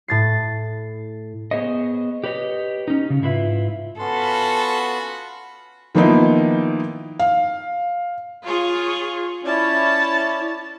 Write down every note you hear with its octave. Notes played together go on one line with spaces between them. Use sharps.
A2 A6 C7
B3 G#4 C5 C#5 D#5
G4 B4 C#5 D#5
C#4 D#4
C#3
G#2 E4 F4 B4 E5
B3 C#4 F4 F#4 A4 B5 C6
D#3 F3 A#3 B3 D#4 E4
F5
F4 G#4 C#5
C#4 E4 C#5 D5 A5